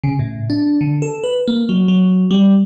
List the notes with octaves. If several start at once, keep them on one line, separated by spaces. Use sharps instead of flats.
C#3
A2
D4
D3
A4
B4
A#3
F#3
F#3
G3